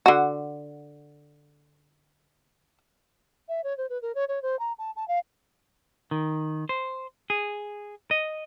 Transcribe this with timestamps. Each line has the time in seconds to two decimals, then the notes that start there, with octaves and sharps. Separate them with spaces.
0.06 D3 F#4
3.49 E5
3.64 C#5
3.78 C5
3.90 B4
4.02 A#4
4.15 C#5
4.28 C#5
4.42 C5
4.59 A#5
4.79 A5
4.96 A5
5.08 F5
6.11 D#3
6.69 C5
7.30 G#4
8.11 D#5